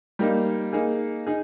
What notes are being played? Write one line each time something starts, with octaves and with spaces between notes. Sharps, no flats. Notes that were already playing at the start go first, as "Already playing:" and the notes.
G3 A#3 D#4
A#3 D#4 G#4
D#4 G#4